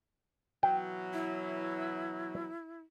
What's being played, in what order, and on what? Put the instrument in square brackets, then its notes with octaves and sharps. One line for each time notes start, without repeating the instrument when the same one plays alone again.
[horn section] B2 E3 F#3 [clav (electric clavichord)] G5
[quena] E4